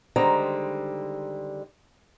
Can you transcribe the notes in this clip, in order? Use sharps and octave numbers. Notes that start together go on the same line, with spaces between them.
D3 D#3 G3 G#3 C5 A#5